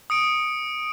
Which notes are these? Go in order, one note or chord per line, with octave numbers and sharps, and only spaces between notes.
D#6 C#7 D7